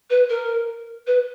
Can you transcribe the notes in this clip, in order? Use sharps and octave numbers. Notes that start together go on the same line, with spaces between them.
B4
A#4
B4